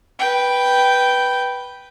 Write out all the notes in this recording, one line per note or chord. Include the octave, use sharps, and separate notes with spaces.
B4 G5